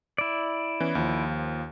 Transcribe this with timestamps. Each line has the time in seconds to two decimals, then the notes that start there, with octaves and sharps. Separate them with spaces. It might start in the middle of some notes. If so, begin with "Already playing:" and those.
0.18 E4 D5
0.80 E3 B3 C#4
0.95 D#2 F3